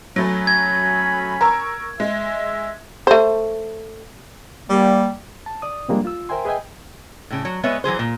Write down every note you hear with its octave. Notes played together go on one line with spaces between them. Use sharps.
F#3 A3 C#4 G#5 B5
G#6
A#4 A#5 C#6 E6
G#3 E5
A3 C5
G3 A#3
A5
D5 D#6
C3 F3 G3 G#3 A#3 D4
F4 E6
A#4 C5 E5 G5 G#5 C6
G#4 B4 D#5 E5 G5 G#5
A2 C#3
F#3
G#3 B3 B4 C#5 E5
E3 F#3 G#4 C5
A#2